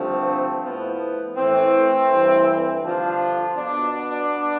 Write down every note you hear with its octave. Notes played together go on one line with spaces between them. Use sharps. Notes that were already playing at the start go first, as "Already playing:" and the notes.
Already playing: G2 D3 F3 A3 C4
A2 F3 B3
A2 E3 A3 C4
G2 E3
G2 D3 F3 D4 F4
B2 B3 D4